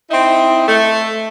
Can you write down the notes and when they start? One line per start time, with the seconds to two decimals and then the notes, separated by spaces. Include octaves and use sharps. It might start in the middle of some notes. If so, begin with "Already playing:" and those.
0.11 C4 D#4 E4
0.67 A3